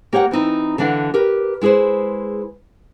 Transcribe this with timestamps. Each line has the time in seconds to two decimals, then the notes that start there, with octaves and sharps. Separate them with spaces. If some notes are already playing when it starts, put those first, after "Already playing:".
0.13 A#3 G4 C#5 F5 F#5
0.31 E3 C4 D#4 E4
0.78 D3 E3 D4 F5 F#5
1.14 G4 A#4 B4
1.61 G#3 E4 G#4 B4 C5